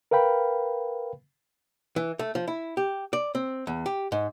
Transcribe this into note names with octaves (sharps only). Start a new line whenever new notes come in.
A#4 B4 F5 G5 B5
E3
A3
F3
E4
G4
D5
C4
E2
G4
G#2